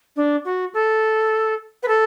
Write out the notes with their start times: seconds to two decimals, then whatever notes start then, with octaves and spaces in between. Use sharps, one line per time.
0.16 D4
0.45 F#4
0.74 A4
1.83 B4
1.88 A4